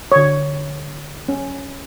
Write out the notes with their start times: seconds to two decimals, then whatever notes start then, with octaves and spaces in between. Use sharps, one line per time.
0.12 D3 C#5
1.29 C#4